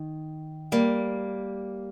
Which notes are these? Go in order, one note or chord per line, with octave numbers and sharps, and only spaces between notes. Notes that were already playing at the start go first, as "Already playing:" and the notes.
Already playing: D#3
G3 A#3